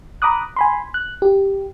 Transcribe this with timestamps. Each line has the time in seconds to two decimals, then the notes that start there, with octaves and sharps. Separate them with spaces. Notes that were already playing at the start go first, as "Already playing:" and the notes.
0.22 A#5 B5 D6 D#6 F#6
0.56 G#5 B5 C6
0.94 F#6
1.22 G4